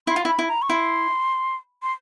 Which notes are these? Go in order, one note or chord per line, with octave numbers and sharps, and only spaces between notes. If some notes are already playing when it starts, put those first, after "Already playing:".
E4 C6
F4
E4
B5
E4
A#5
C#6
E4 C6
C6